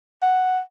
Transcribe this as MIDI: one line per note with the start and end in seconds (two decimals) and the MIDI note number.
0.22 0.60 78